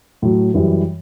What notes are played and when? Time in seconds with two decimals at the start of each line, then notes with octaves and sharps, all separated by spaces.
0.22 A2 F#3
0.54 F#2 E3 G3